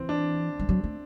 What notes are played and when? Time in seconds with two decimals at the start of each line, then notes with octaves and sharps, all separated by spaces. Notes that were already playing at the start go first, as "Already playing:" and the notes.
Already playing: E3 C4
0.09 D4
0.59 G3
0.69 F#3
0.84 A3